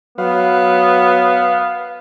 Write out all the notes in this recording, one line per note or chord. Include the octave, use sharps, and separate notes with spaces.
F#3 B3 B4 F5